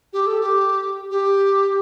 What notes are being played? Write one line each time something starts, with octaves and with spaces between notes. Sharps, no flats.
G4
A4
G4
G4